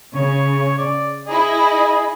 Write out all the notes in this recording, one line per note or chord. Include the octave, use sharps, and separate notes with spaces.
C#3 C#5
D5
E4 G#4 D#5